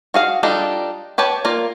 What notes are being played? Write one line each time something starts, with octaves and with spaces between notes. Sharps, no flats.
F#4 G#4 F5
G3 D4 D#4 F4 A4
G4 B4 C#5 A5
A#3 F4 A#4 D5